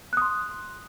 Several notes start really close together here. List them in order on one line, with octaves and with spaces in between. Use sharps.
F#6 D#6 C6